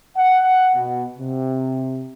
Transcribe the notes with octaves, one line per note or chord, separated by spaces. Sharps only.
F#5
B2
C3